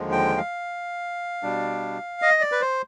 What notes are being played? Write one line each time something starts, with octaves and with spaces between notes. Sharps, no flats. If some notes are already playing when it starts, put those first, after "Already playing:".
Already playing: D#2 D3 F3 G#3
G5
F5
B2 G3 D4
D#5
D5
B4
C5